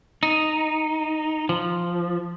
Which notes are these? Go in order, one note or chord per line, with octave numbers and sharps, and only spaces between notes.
D#4
F3